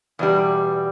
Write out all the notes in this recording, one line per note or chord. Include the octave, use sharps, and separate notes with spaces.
E2 B2 G3